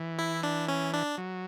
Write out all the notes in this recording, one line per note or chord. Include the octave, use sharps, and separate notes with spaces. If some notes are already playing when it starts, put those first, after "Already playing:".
Already playing: E3
E4
D4
C#4
D4
F#3